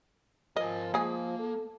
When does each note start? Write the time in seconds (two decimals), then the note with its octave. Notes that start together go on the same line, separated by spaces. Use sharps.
0.56 F3 A#4 D#5 G#5
0.94 G#3 A#3 G#4
1.39 A4